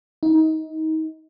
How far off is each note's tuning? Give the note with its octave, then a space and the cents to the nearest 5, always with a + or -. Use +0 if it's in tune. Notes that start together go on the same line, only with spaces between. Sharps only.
D#4 +25